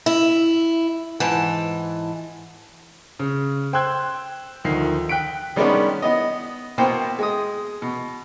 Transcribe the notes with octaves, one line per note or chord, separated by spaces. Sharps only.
E4
G#2 E3 A5
C#3
C5 G5 C6 E6 F#6 G#6
D2 D#3 F3 C7
G5 F#6 B6 D7
D#3 G3 G#3 B3 C#4 D4
B3 D#5
B2 A#3 B3 C5 G5
G#3 D#6
B2